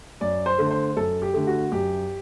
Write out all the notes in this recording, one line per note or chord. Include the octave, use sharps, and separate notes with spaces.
F#2 D5
C5
D3 A3
C5
F#2 A4
G4
D3 A3
F#4
F#2 G4